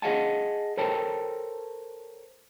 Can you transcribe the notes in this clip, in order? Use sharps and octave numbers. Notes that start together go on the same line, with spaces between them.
G#4 D#5 F5 F#5 G#5 A5
A4 A#4 C5 C#5 G5 A5